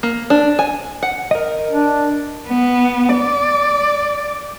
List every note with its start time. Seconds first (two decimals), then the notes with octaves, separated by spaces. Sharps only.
0.03 A#3
0.30 D4
0.59 G#5
1.03 F#5
1.31 A#4 D#5
1.71 D4
2.48 B3
3.15 D5